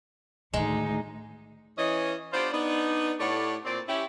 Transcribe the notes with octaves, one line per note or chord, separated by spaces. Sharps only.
D2 A2 D#3 G#3 D#4
E3 C#4 D#5
B3 D4 F4 G4 C5
B3 D4 D#4
A2 A3 G4 C#5 D5 F#5
A#2 C4 D5
C#4 E4 G4